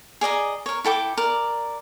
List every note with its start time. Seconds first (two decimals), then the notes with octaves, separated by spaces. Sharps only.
0.21 G#4 D5 D#5 A#5
0.66 A#4 C#5
0.84 E4 A4 G5 D6
1.17 A#4 D5